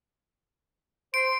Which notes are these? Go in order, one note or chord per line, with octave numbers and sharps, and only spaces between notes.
C5 C6 D7